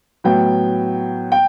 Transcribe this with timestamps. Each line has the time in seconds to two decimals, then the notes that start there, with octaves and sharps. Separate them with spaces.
0.24 A2 F#3 B3 G5
1.32 G5